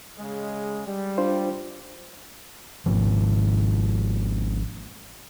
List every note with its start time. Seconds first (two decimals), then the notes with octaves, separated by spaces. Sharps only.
0.18 C#3 G#3
0.85 G3
1.18 D4 F4 C5
2.86 G#1 G#2 F3